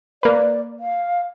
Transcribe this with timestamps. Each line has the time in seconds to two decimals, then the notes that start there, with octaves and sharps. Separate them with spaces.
0.23 A#3 B4 D5
0.80 F5